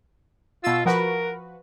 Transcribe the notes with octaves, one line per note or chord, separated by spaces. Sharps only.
B2 F4 E6
F3 F#4 A#4 B4